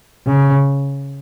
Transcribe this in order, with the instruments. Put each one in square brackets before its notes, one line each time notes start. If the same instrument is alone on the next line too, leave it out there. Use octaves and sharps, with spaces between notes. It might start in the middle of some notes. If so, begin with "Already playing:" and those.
[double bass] C#3